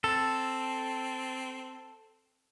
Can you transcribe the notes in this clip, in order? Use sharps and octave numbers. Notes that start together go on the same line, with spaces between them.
C4 A4